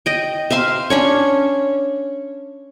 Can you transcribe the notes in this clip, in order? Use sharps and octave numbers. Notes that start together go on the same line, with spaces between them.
D#5 G5
C5 E5 F5 C6
C#4 D4 C#5